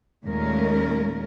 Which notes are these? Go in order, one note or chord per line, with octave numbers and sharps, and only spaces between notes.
D#2 A#2 G#3 A3 C#4 A#4